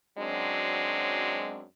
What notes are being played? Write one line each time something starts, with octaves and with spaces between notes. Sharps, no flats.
F#2 F#3 G#3 C4 D4